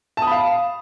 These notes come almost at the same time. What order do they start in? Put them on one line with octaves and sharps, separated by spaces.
A5 D#6 B5 F5